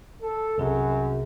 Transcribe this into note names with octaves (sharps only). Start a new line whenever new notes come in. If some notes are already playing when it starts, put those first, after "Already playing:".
A4
C2 F#2 C3 G#4